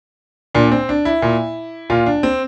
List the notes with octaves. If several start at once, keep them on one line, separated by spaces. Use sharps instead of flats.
A#2 D4
C4
D4
E4
A#2
A#2 F4
D4
C4